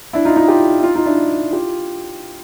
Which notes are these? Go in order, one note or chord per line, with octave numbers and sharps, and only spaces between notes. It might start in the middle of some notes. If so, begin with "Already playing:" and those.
D4 E4
D#4 F4
D#4 F4
F4 G4
E4
D#4 F4
D#4 F4
D4 E4
F4 G4